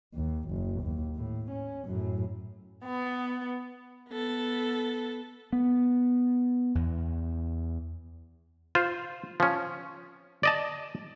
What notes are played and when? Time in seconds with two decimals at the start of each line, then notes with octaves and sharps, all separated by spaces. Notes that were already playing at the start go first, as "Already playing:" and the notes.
0.15 D#2
0.50 F#1
0.82 D#2
1.16 A2
1.51 C#4
1.86 F#2 A2
2.85 B3
4.09 B3 A4
5.53 B3
6.75 E2
8.75 F4 C5
9.40 F3 C#4
10.43 D5 D#5 A5